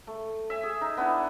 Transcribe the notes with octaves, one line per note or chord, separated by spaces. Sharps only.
A3
E5 G#5
G#4
D#4
B3 D4 E4